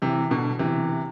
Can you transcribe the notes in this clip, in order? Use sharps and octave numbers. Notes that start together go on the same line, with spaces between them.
C3 E3
B2 D3
C3 E3